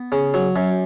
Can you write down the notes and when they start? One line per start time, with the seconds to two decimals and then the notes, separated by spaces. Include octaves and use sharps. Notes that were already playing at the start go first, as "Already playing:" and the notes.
Already playing: B3
0.12 C#3
0.34 F#3
0.56 F#2